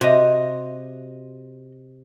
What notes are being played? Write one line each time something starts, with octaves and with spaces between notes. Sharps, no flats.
C3 F#4 D#5